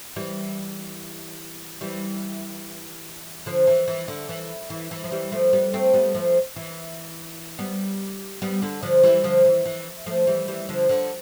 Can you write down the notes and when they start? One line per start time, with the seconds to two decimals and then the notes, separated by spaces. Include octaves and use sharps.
0.16 E3 G3
1.81 E3 G3
3.46 D3 F3
3.67 E3
3.88 E3
4.08 D3
4.29 E3
4.70 E3
4.91 E3
5.04 F3
5.12 E3 G3
5.32 F3 A3
5.53 G3 B3
5.73 A3 C4
5.94 G3 B3
6.14 F3 A3
6.56 E3
7.59 G3 B3
8.42 G3 B3
8.62 D3
8.83 D3 F3
9.03 E3 G3
9.24 D3 F3
9.45 E3
9.65 E3
10.06 F3 A3
10.27 E3 G3
10.48 E3 G3
10.69 D3 F3
10.89 D3